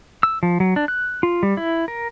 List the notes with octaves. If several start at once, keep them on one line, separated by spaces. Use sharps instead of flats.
E6
F3
F#3
D4
F#6
F4
G3
E4
A#4